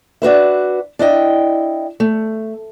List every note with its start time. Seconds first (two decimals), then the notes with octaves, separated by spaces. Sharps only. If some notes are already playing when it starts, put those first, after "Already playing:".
0.22 D4 F#4 B4 E5
0.99 D4 E4 D#5 G5
2.00 A3